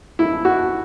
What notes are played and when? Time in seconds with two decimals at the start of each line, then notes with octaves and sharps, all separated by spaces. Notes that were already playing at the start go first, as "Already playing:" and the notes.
0.19 E4
0.45 F#4